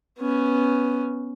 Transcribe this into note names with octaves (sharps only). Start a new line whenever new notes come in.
B3 C#4